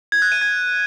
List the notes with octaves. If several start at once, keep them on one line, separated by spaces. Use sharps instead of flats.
G#6
F#6
D#7
G#6